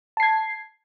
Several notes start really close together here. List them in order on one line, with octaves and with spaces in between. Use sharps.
A5 C7 G#6